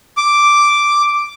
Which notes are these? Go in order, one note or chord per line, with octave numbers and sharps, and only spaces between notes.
D6